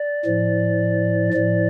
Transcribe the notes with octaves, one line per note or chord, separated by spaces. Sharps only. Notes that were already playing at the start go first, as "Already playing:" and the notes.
Already playing: D5
A2 F3
A2 F3 D5